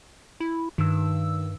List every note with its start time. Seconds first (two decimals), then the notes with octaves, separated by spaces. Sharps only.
0.40 E4
0.78 G2 D#3 E6